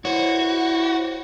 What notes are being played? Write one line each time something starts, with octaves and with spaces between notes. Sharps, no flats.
E4 F#4 C5 C#5